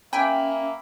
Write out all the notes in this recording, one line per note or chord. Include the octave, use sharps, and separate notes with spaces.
A#3 C#4 E5 G5 G#5 B5